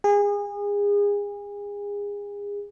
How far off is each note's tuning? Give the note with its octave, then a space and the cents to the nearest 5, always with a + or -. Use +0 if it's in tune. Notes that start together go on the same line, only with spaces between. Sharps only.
G#4 -30